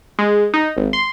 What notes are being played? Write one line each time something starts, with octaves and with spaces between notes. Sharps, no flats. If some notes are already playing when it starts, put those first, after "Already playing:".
G#3
D#4
G#1
C6